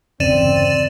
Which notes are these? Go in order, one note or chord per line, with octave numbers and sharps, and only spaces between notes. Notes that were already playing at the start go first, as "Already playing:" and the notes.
G1 E2 C#3 C4 D5 D#7 E7